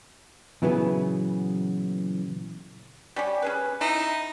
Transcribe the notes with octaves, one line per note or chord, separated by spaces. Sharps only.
A#2 C#3 E3 F#3 B3
G3 C#4 G4
C#4 G#4 B4
D#4 E4